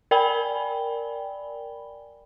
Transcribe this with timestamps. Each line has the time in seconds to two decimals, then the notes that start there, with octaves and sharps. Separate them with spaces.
0.11 A#4 D5 G5 G#5 B5 G7